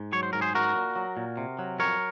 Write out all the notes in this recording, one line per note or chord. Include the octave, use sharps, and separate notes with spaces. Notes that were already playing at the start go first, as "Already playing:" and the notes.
Already playing: G#2
F#3 C#5
C5
G#2 A#4
G#4 C5
F#3 F#4 A#4
A#2
F#3
A#2
C3
F#3
F2 A#4 C#5